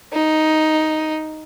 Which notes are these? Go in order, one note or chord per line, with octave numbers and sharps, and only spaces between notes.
D#4